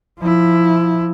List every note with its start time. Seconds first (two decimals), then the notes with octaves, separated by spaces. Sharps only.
0.19 F3 E4